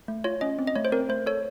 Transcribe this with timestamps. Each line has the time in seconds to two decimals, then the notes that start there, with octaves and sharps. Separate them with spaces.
0.08 A3
0.24 F4 C#5
0.41 C#4 D#5
0.59 C4
0.67 D#5
0.76 A3 C#5
0.85 C5
0.92 C4 A#4
1.09 A3 C5
1.26 A4 C#5